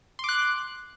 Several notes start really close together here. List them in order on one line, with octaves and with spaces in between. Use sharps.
C6 D6 F#6